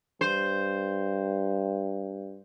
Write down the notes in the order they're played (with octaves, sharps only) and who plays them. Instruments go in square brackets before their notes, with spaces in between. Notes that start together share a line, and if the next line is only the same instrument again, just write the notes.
[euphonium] G2 [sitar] C5